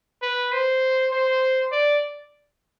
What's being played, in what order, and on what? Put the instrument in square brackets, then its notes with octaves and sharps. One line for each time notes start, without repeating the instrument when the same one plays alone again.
[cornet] B4
C5
C5
D5